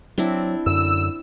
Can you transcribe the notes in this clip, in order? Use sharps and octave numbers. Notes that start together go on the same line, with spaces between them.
F#3 C4 D4 E4
F#2 D3 E6